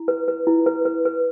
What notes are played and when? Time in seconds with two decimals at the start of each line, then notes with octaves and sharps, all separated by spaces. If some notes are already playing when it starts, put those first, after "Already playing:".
Already playing: E4
0.08 B4
0.28 B4
0.47 E4
0.66 B4
0.85 B4
1.05 B4